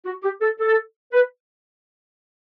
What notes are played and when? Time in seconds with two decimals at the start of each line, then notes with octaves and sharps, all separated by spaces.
0.06 F#4
0.23 G4
0.42 A4
0.60 A4
1.13 B4